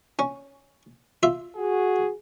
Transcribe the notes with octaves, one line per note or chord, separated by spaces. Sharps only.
C#4
F4 E5
F#4 G#4